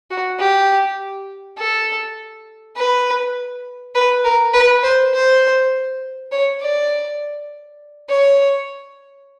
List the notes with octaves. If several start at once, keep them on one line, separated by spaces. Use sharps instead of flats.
F#4
G4
A4
B4
B4
A#4
B4
C5
C5
C#5
D5
C#5